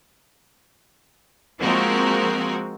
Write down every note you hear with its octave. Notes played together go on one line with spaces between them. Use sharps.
F3 G#3 A#3 C4 F#4 A#4